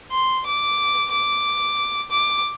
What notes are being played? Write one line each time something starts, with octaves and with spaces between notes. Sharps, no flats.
C6
D6
D6
D6